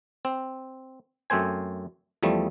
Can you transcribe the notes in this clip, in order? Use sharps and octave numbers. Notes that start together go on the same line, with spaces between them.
C4
F#2 A3 C4 C5 G#5
E2 F3 G3 A3